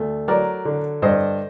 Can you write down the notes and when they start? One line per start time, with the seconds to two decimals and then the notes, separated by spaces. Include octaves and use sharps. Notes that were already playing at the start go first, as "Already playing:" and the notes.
Already playing: D2 A3
0.28 F#3 A#4 D5
0.65 D3
1.02 G2 C5 D#5